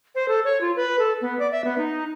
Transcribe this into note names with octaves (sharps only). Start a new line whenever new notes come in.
C5
A4
C#5
F4
B4
A4
B3
D5
E5
B3
D#4